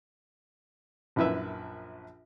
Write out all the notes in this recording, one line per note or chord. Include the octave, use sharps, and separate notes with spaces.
A#1 F#2 E4 B4 E5